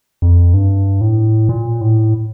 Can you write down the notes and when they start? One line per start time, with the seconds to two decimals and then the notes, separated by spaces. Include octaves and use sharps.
0.22 F2
0.54 G2
1.01 A2
1.49 A#2
1.81 A2